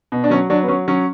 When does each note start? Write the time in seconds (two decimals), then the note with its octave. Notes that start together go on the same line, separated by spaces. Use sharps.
0.12 B2
0.24 D4
0.30 F#3 C#4
0.50 F#3 D4
0.63 B3
0.68 F#3 C#4
0.88 F#3 C#4